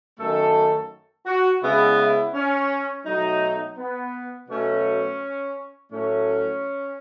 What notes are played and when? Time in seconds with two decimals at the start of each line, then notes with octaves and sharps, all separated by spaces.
0.19 F#2 D#3 A3 A4
1.26 F#4
1.62 C#3 G#3 B3 E4
1.97 E4
2.34 C#4
3.05 B2 F#3 A3 D#4
3.78 B3
4.49 B2 F#3 A3 C#4
5.92 A2 F#3 A3 C#4